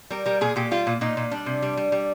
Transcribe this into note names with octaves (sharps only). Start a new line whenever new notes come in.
G3 A#4
G3 A#4
A#2 G#4
A#2 G4
G3 F4
A#2
A#2 D#4
A#2
G3 D4
C3
G3
G3
G3